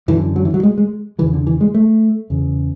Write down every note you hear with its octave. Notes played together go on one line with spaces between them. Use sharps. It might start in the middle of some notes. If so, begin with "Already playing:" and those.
F#2 D3 E3
F#3
E3
F#3
G#3
G#3
E2 C#3 E3
D3
E3
G#3
A3
E2 C#3